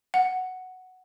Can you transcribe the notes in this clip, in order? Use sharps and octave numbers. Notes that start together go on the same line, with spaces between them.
F#5